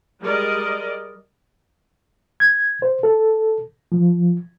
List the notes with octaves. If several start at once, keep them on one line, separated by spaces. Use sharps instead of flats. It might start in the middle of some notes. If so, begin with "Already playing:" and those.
G3 G#3 A#4 D5 D#5
G#6
C5
A4
F3